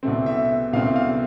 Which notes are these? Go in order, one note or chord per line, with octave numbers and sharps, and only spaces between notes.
C2 B2 A3 C4
E5
C2 B2 A3 C4 F5
F5